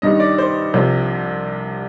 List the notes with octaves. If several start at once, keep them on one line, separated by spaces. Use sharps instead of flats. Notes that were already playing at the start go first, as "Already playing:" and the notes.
G2 D#3 G3 D#5
D5
C5
C2 C3 F3